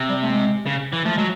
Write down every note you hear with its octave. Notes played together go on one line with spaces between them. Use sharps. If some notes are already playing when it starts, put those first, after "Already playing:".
Already playing: C3
G3
A3
G#3
C#3
E3
F3 A3
F#3 G#3